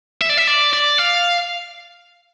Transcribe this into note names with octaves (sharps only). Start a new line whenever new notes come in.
E5
D5
E5
D5
D5
F5